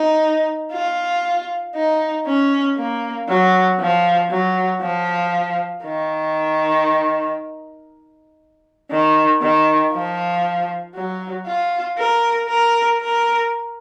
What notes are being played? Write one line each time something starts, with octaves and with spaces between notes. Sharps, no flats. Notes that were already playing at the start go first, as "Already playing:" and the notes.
Already playing: D#4
F4
D#4
C#4
A#3
F#3
F3
F#3
F3
D#3
D#3
D#3
F3
F#3
F4
A#4
A#4
A#4